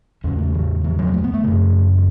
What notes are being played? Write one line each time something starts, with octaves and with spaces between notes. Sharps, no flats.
E2 C#3 C#4
A3
E3
E3
F#3
B3
A3
B3
A3
F#2 C#3
G#3